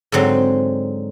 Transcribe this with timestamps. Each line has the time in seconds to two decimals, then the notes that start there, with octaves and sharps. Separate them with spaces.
0.12 G#2 D3 F#3 C4